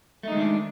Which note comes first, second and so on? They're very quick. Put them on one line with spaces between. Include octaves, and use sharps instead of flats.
A3 D#4 G#3 D#3 D4